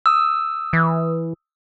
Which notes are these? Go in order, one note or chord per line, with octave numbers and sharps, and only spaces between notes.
D#6 E6
E3